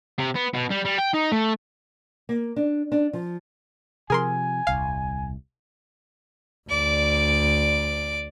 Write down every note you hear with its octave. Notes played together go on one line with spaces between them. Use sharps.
C3
B3
B2
G3
G3
G5
D#4
A3
A#3
D4
D4
F3
C3 F3 G#4 A#4 G#5 C6
D#1 C2 F5
D2 D5 D6